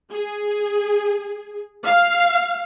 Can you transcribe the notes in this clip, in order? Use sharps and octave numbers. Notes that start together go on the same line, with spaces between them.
G#4
F5